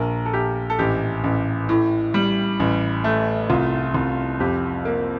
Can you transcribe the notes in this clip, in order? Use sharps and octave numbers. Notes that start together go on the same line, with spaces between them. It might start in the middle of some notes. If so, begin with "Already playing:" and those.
Already playing: A#1 A#4
A4
A#1 G4
A4
A1 G4
A1
A2
G3
A1
A3
C2 F4
C2
F2 G4
A#3